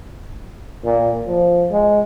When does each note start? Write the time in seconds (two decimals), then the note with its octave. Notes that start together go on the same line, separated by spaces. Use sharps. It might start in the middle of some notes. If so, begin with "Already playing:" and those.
0.84 A#2
1.27 F3
1.71 G#3